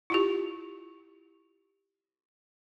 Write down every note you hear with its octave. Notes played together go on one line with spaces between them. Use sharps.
E4 F4 G4